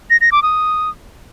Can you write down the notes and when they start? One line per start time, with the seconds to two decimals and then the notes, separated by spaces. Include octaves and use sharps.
0.10 A#6
0.21 A#6
0.32 D6
0.43 D#6